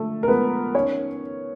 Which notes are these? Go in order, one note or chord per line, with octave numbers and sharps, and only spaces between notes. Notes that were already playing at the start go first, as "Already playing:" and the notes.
Already playing: D3 F3 G#3 A3 A4
A#4
F3 G#3 B3 B4
D#3 C#4 C#5